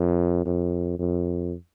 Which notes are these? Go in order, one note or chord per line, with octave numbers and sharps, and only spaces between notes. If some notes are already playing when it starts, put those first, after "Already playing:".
Already playing: F2
F2
F2